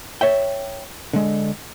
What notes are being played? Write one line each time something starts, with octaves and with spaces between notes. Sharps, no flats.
C#5 E5 G5
D3 G#3